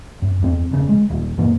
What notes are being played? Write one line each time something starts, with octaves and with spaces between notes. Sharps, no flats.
F#2
E2 C4
E1 C#3
G#3
D#1
F#2 A#2 E3 A#3